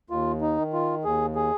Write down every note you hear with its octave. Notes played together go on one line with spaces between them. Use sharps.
D#2 F4
D#4
D#3
F4
D#2 G#4
G#4